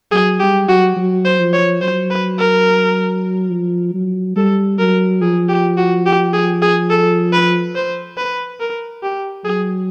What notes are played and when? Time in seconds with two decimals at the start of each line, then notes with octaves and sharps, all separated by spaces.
0.12 F#3 G#4
0.40 G3 G4
0.69 F#3 F#4
0.96 F#3
1.25 C5
1.40 F3
1.53 C#5
1.82 F#3 C5
2.10 B4
2.39 A#4
3.52 F3
3.94 F#3
4.36 G3 A4
4.79 F#3 A#4
5.21 F3 G#4
5.49 G4
5.77 F#4
6.06 G4
6.34 G#4
6.62 G#4
6.90 A4
7.33 B4
7.75 C5
8.17 B4
8.60 A#4
9.03 G4
9.45 F#3 G#4